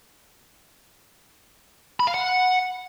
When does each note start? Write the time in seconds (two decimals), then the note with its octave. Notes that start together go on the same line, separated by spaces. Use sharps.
2.00 B5
2.07 F5
2.14 F#5